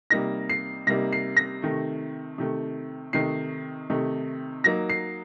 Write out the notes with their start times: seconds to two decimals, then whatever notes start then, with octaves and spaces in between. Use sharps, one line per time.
0.10 C3 G3 A#3 D#4 A#6
0.50 C7
0.87 C3 G3 A#3 D#4 A#6
1.13 C7
1.37 A#6
1.62 C3 D#3 A3
2.38 C3 D#3 A3
3.13 C3 D#3 A3 D#4 C7
3.90 C3 D#3 A3 D#4
4.64 F#3 A#3 D#4 A#6
4.90 C7